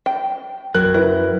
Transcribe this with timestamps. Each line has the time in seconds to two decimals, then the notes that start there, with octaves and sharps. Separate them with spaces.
0.06 G5
0.74 F#2 F#3 A#4 F#6
0.94 E4 A#4 B4